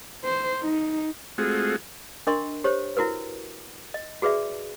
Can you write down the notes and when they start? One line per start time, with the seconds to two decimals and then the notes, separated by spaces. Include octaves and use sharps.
0.24 C5
0.62 D#4
1.38 G#3 A3 C4 F4 F#4 G#4
2.27 D4 A#4 D#5 C6 C#6
2.64 G4 C5 C#5
2.97 E4 F#4 A#4 B4
3.94 D#5
4.22 F#4 G#4 B4 D5 E5